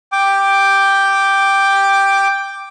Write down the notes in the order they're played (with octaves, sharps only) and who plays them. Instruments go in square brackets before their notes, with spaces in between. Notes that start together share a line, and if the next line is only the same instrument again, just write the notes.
[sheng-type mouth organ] G5 D6